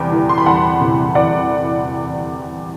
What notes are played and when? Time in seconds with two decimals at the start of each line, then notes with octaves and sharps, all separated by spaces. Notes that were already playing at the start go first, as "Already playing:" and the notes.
Already playing: E2 C3 G3 G5 B5
0.12 E3
0.29 C6
0.38 B5
0.46 E2 F#5 A5
0.81 C3
1.15 E3 D5 F#5